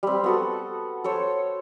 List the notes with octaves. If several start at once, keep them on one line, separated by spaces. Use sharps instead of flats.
G3 C4
B3 F#4 A4
A4 C5 C#5